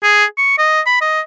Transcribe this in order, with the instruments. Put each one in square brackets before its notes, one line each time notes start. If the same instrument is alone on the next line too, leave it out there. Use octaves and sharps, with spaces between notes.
[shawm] G#4
C#6
D#5
B5
D#5